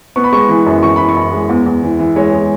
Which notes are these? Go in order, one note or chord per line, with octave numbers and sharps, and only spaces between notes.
B3 C#6
B5
G#3 C#6
E3
F#2
E3 C#6
E3 B5
C#6
F#2
G#3
E2
E2
E3
E3
G#3 C#5
G#3